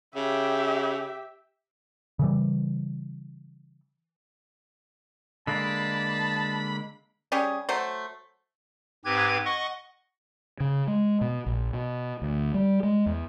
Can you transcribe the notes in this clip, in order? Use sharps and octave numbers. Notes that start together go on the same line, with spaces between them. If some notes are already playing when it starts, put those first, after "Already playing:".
C#3 G4 E5
C#3 E3 G3
D3 G#3 A#3 A5 B5
G3 C#4 G4 G#4
F#3 A3 C5
G#2 C4 G4 B4 G#6
D#5 F#5 C#6
C#3
G#3
B2
A#1
B2
D2
G3
G#3
E2